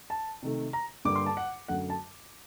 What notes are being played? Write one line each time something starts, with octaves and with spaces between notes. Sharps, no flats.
A5
C3 D#3 A3
A#5
G2 D3 G3 A#3 D6
C6
A5
F#5
F#2 D3 F#3 A3 F#5
A5